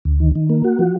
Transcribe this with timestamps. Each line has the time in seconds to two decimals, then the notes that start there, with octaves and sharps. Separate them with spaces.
0.05 D2
0.20 D#3
0.35 D#3
0.49 A#3
0.64 F#4
0.79 F3